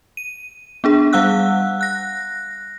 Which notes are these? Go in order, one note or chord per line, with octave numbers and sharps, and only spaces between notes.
D#7
B3 D4 G#4
G3 F5 F#5 E6 F#6
F#6 A#6